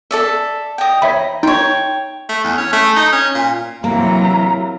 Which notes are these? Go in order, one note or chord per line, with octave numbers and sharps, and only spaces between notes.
A4 D5 E5
D#5 G5
D#4 C#5 E5 B5
D#4 C#5 G5 C6
A3
E2
C#4
A3
D#4
C#4
A#2
C3 E3 F#3 A#3 A#5